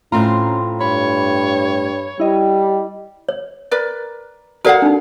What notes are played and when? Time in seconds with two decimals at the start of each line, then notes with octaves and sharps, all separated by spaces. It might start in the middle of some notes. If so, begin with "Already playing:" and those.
0.12 A2 C4 C#4 F4 A#5 C6
0.80 G2 C#5 B5
2.20 G3 E4 D#5
3.29 C#5
3.71 A#4 B4 D5
4.65 F#4 A4 A#4 D5 F5 F#5
4.82 D4 D#4